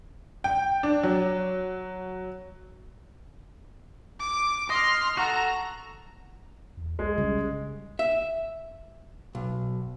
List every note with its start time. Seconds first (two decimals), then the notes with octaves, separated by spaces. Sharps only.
0.44 G5
0.83 D4
1.03 F#3
4.20 D6
4.70 D#5 C6 F6
5.17 F#4 A4 A#5
6.77 E2
6.99 B1 G#3
7.18 C#3 G3
7.99 E5
9.35 B1